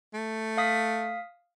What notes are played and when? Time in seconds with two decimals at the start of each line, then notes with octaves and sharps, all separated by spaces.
0.14 A3
0.57 F5 D#6 B6